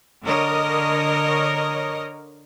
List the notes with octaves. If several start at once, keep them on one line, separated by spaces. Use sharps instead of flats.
D3 A#4 C#5 D#5